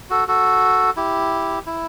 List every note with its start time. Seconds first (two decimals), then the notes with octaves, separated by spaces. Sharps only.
0.10 F#4 A4
0.28 F#4 A4
0.96 E4 G4
1.66 E4